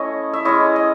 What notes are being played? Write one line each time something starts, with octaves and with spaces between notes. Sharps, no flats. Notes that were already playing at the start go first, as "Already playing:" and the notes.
Already playing: A3 C#4 E4 C#5 D#5
E5
G#3 C#4 E4 C#5 D#5
D#5